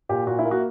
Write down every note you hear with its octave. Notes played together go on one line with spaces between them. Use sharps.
A#2 G4
A#2 F#4
E4
A#3
F#4